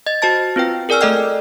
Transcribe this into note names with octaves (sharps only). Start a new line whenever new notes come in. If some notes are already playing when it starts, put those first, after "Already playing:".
D#5 A6
F#4 C5 A5 A6
C4 F4 B4 G5
G#4 A#4 D5 G#5 E6 F6
A3 A4 D5 D#5 G5 F6